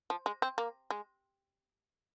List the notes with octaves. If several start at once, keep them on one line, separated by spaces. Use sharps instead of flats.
F3
G#3
C4
A#3
G#3